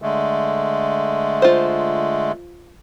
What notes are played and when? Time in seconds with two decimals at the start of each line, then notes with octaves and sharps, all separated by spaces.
0.02 D3 G#3 A3
1.42 F4 C5